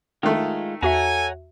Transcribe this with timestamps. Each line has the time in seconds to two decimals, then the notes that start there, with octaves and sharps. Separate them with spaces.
0.23 D#3 G#3 A3 F4
0.83 E2 F#4 A4 C#5 E5 F#5 G#5 A#5